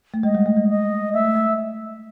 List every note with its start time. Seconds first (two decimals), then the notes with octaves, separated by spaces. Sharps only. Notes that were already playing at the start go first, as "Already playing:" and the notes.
0.14 A3
0.23 G#3 D#5
0.35 G3
0.46 A3
0.57 G#3
0.69 D#5
1.13 A3 E5
1.25 A3
1.35 A3